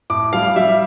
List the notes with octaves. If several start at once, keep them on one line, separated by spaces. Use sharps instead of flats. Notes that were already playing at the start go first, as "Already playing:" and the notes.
A2 D6
G3 F5
G3 E5